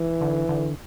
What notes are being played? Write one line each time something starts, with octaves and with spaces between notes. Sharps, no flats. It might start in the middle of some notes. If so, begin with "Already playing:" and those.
Already playing: E3
D3
D3